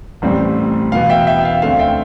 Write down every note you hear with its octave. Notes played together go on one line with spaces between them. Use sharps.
A1 A2 G3 C4
E2 B2 B3 F5
E5 G5
E5 G5
F5
D2 D3 A3 C4 F5
E5 G5